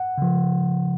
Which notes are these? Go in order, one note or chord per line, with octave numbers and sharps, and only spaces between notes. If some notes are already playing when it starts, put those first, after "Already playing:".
Already playing: F#5
C#3 F3